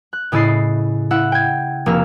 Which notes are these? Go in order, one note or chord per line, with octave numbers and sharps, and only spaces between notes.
F#6
A2 C#3 E4 D#5 A6 C7
E4 E5 F#5
G5 G#6
F1 A#3 E6 F6